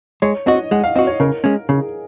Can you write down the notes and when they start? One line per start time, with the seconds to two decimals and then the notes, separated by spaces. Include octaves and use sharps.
0.22 G#3 C#5
0.47 C4 F#4 D#5
0.71 G#3 F#5
0.84 F5
0.95 C4 F#4 D#5
1.07 C#5
1.20 C#3 A#4
1.44 G#3 C#4
1.69 C#3 G#4